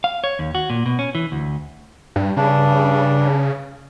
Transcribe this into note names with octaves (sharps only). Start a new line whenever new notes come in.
F5
C#5
D#2
F#4
A#2
B2
C#4
E3
D2
G2
G2 C#3 D4